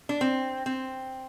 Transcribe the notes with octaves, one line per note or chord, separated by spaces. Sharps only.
D4
C4
C4